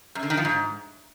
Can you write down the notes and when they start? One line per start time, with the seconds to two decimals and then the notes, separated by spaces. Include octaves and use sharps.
0.15 F#2
0.23 D3
0.30 D#3
0.37 F3
0.45 G#2